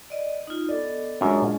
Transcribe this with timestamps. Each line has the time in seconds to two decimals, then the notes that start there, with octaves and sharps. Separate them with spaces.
0.10 D5 D#5
0.47 D#4 F4
0.69 B3 A4 D5 D#5
1.21 F#2 G#3 C#4 D4 F4
1.42 A#2